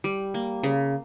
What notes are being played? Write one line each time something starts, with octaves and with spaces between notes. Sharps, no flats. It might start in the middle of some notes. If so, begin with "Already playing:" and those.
G3
A#3
C#3